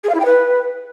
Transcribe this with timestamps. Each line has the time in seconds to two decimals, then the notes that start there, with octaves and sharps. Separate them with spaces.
0.04 G#4
0.09 F5
0.14 E4
0.20 G5
0.25 B4